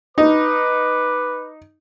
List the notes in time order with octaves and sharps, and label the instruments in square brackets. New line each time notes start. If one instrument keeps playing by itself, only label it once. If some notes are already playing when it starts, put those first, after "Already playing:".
[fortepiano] D#4 [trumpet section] B4 D6